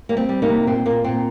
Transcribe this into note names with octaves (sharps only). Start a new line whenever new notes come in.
G3 A#3
C4
G3
A#3 D#4
C3
A#2 C4
A#2 A#3
A#2 C4